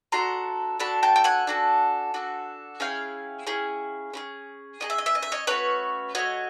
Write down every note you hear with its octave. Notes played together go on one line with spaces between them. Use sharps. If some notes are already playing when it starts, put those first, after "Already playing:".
D4 F#4 A4 A#5 C6
D4 F#4 A4 A5 B5
G5 A5
G5
F#5 G#5
D4 F#4 A4
D4 F#4 A4
C#4 E4 G#4 F5 G5
C#4 E4 G#4
C#4 E4 G#4
C#4 E4 G#4 D#5
E5
D#5
E5
D#5
E5
C#5 D#5
A3 C#4 F#4 B4 C#5
A3 C#4 F#4 C#5 D#5